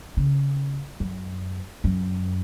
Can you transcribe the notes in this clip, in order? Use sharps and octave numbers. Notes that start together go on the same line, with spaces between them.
C#3
F#2
F#2